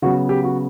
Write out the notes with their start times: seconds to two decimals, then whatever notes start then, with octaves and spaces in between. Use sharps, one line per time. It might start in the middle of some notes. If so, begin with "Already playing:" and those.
0.02 C#3 F#3 B3 F#4
0.29 G4
0.44 F#4